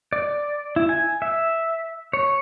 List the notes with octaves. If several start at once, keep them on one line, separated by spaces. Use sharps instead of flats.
D5
E4
G#5
E5
C#5